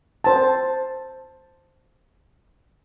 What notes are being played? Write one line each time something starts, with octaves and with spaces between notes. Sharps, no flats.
C5 A5